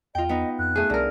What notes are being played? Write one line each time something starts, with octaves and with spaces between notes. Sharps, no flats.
E2 F4 D#5 G5
B3 D#4 D#5
F2 F#6
A3 G#4
C2 D3 A#4